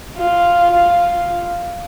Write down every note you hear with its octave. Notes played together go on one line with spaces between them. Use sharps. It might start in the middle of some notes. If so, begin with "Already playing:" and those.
F4
F4